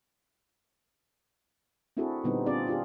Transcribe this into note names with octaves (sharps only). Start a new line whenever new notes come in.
C4 D4 E4 F#4 G#4 A4
A#2 D3 G3 B3 C4 D#4
C4 D4 F4 G#4 D5
D4 F4 G4 G#4